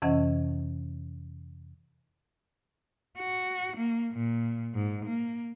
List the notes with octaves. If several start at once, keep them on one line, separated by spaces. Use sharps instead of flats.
F2 C3 E3 C#4 D#5 F#5
F#4
A#3
A#2
G#2
A#3